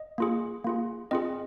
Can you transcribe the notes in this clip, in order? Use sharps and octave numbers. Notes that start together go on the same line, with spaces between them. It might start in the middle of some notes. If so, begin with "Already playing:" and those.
Already playing: D#5
A#3 F4 G#4
A#3 F4 G#4
C4 F4 G#4 D#5